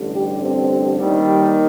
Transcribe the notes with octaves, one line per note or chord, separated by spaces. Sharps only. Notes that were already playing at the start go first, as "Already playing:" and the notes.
Already playing: A1 G2 D3
G4
C4
D#2 D#3 G3